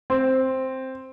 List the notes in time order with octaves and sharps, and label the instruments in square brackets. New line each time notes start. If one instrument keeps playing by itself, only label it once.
[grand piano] C4